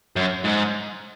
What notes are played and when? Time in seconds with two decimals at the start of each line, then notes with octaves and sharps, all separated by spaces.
0.16 F#2
0.45 G#2